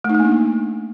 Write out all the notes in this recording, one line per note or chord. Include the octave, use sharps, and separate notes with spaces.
A3
D#4
A3
A#3
D4